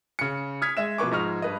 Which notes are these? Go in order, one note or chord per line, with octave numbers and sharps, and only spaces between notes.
C#3 C#7
D#6 F6 G#6 B6
G#3 E5 E7
B2 F3 B4 C#6 D6
G#2 F3 D#5 C#6 F6 F7
G2 B4 D#5